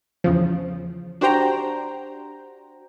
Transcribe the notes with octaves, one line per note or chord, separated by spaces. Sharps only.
E2 C#3 F3
D4 F#4 G4 C5 G5 A#5